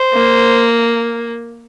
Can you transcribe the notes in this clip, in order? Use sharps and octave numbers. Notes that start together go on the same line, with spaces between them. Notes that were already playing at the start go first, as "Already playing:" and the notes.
Already playing: C5
A#3